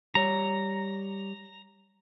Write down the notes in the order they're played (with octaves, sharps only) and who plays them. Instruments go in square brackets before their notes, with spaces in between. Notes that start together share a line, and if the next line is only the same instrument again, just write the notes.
[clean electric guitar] G3 C#5 [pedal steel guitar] A#5